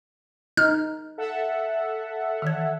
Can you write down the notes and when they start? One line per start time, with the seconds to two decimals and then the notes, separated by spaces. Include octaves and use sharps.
0.57 D#4 F6
1.18 A4 E5 F#5
2.42 D#3 E3 G#6